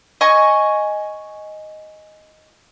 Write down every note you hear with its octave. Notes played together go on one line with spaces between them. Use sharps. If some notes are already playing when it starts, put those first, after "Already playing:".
D#5 G#5 C#6